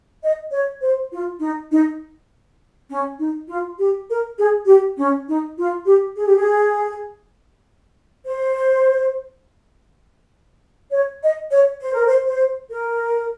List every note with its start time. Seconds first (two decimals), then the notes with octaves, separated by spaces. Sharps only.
0.22 D#5
0.51 C#5
0.81 C5
1.11 F4
1.40 D#4
1.70 D#4
2.89 C#4
3.18 D#4
3.48 F4
3.78 G4
4.08 A#4
4.37 G#4
4.67 G4
4.97 C#4
5.27 D#4
5.57 F4
5.85 G4
6.16 G#4
6.26 G4
6.37 G#4
8.24 C5
10.91 C#5
11.22 D#5
11.50 C#5
11.80 C5
11.93 A#4
12.06 C5
12.25 C5
12.70 A#4